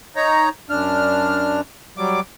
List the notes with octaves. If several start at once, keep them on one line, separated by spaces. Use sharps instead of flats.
D#4 C#5 A#5
F#2 D4 F6
F#3 G3 D6